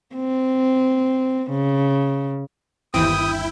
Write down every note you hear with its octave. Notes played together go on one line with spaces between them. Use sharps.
C4
C#3
G1 D#2 E3 C4 E4 G5 D#6